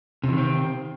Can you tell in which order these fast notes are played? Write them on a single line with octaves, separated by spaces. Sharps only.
C3 E3 D#3 C4